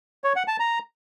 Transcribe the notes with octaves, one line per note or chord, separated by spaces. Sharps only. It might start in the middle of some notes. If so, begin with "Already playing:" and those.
C#5
F#5
A5
A#5